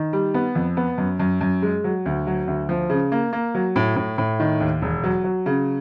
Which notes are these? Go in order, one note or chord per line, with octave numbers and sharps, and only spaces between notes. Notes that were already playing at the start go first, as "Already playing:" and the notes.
Already playing: D#3
G3
B3
F2
B3
F#2
F#2
F#2
G#3
F#3
D2
F#3
D2
F3
C#3
A#3
A#3
F#3
A2
A2
A2
D#3
D#2
E1
F#3
F#3
C#3